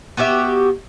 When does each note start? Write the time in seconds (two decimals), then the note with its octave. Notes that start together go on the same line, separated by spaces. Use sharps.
0.17 B3 F#4 G4 E5